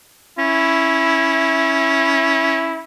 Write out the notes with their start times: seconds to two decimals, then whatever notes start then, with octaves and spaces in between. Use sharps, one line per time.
0.39 C#4 E4